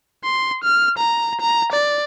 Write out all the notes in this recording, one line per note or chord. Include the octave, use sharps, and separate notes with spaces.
C6
F6
A#5
A#5
D5